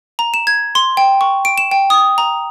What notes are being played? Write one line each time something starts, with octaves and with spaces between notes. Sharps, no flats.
A#5
E7
G#6
C6
G5
C#6
D7
E7
G5
D#6
A#5